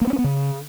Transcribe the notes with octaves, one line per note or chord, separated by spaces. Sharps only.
A#3
B3
C#4
B3
C#3